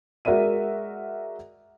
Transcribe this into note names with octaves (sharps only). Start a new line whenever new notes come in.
G#3 F#4 A#4 D5 E5 D#7